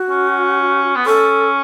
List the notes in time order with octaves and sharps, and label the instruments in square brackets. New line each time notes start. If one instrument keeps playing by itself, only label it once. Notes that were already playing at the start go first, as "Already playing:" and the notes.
Already playing: [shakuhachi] F#4
[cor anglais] C#4
B3
[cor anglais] C#4 [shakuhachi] A4